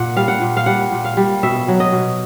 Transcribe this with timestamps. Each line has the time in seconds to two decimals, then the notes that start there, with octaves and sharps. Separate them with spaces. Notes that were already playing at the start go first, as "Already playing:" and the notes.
Already playing: A#2 F#5
0.16 G3 F5
0.28 F#5
0.42 A#2
0.57 F5
0.66 G3 F#5
0.92 A#2
1.05 F5
1.17 G3
1.43 B2 E5
1.68 F#3
1.80 D#5
1.92 B2